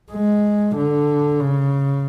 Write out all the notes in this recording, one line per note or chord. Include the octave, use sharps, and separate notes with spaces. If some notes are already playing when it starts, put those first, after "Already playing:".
G#3
D3
C#3